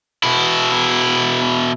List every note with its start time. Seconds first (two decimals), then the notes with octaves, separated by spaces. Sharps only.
0.23 B2 E4